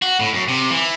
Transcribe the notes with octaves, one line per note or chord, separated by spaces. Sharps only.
F#4
A2
F#2
C3
E3